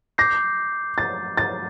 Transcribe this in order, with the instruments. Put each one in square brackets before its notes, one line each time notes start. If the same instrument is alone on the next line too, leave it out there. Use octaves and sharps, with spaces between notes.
[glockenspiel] D6 G6 C7 [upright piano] A#6
[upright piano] A6
A6